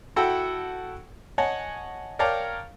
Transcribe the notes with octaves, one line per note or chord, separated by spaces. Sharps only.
E4 F#4 A4 F#5 G5 E6
C#5 D#5 F#5 G#5 A5
A#4 C#5 D5 F5 G5 A5